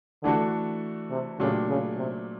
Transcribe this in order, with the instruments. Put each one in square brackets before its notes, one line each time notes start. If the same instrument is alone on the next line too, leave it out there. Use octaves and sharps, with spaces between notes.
[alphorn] D3 [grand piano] E3 A3 D4 F#4 A4
[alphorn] C3
[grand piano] A#2 F#3 A3 D4 G4 [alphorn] C#3
[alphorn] C#3
C3